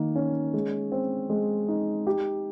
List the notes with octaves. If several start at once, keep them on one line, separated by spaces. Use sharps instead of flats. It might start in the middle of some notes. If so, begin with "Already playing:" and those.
Already playing: D#3 A#3
C#4
G#3
C4
G#3
D#4
G4